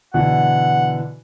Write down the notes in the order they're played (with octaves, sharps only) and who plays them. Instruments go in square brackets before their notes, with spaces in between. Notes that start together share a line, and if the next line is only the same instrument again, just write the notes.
[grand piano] B2 D3 E3 [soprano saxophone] F#5